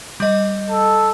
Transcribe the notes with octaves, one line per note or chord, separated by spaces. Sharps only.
G3 D#5
A4